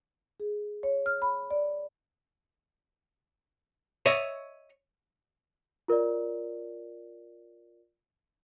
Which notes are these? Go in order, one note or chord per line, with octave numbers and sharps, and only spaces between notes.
G#4
C#5
F6
B5
D5
C#5 D#5 E5
F4 A#4 C#5 D5